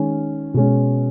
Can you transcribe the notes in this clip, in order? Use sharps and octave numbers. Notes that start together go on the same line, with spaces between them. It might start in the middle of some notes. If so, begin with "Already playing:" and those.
Already playing: D#3 G#3 C#4
B2 G#3 C#4